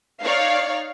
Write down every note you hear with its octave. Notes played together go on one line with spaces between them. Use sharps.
D#4 C#5 D5 F5